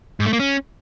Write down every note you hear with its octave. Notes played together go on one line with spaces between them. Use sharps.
G#2
A3
A#3
C#4